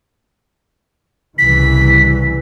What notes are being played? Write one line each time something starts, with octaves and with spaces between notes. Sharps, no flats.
C2 C#3 E3 B6